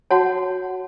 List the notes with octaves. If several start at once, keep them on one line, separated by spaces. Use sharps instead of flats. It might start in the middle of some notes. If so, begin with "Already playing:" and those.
F#4 C#5 F#5 A5